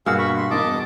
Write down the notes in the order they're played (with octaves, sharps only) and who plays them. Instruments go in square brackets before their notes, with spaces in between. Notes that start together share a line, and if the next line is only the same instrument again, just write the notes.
[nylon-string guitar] G2 A#3 [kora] B2 F#4 [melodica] G#4 F5 E6
[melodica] B5 C#6
C6
[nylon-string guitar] E3 A#3 D#4 [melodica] D#5 A5 D6
[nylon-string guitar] E2 G#2 B2